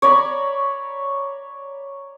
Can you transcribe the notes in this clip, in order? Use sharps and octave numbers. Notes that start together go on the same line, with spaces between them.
C#5 D5 A#5 B5